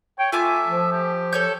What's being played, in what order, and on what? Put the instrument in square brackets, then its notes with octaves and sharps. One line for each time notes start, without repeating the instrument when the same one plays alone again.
[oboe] C#5 [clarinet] G5
[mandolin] A3 G#5 D6 [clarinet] F4 [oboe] E5
[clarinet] F3
[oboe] G4
[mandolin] A4 C#5 G6